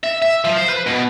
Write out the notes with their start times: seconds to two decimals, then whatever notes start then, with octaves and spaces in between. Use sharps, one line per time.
0.04 E5
0.22 E5
0.45 F3
0.57 C5
0.69 B4
0.87 B2